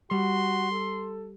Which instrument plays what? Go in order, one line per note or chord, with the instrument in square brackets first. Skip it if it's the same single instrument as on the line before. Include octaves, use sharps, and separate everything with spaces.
[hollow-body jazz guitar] G3 [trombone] F#4 [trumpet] C6
[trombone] A4